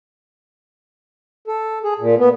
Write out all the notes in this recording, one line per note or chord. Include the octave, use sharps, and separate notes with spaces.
A4
G#4
A#2
B3